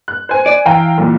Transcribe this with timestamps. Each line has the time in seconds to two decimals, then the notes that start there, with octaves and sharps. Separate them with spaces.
0.08 F#6
0.29 C5 G#5
0.46 D5
0.66 E3 F5 G5 A#5
0.98 B1 A#2